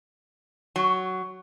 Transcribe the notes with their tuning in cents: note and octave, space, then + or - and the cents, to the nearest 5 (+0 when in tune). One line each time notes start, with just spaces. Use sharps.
F#3 +10